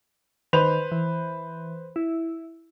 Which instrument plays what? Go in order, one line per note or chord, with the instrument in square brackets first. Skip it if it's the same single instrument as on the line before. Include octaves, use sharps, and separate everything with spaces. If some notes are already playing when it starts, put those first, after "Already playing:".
[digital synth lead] D#3 [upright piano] B4 C5 F7
[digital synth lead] E3
E4